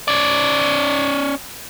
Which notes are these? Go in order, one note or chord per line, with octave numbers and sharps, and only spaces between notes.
C#4 D5